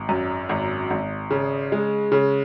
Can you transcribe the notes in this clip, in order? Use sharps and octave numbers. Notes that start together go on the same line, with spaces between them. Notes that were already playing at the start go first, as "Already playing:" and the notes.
Already playing: G#1
F#2
G#1
G#1
C#3
G#3
C#3